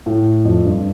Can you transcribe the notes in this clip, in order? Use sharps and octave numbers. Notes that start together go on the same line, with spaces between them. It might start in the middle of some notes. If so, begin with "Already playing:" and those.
A2
F2
G2